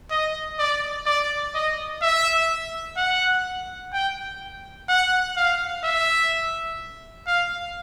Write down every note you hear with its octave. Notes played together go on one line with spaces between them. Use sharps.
D#5
D5
D5
D#5
E5
F#5
G5
F#5
F5
E5
F5